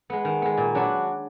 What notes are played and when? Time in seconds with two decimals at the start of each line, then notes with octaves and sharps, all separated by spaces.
0.10 G#3 B3
0.25 D#3
0.42 G#3 B3
0.57 A#2
0.75 F#3 D4 F#4 B4